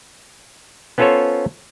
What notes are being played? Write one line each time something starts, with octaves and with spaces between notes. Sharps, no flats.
B3 C#4 F4 A4 C5 C#5